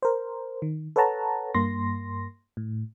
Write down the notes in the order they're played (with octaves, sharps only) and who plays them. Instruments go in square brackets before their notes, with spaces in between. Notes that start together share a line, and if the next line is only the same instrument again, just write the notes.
[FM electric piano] A#4 C5
D#3
A4 B4 C#5 F#5 A5 A#5
G2 A#3 C6 A#6
A2